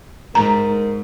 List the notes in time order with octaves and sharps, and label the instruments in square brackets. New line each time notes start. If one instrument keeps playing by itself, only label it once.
[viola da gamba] G#2 [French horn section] A#4 [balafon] A#5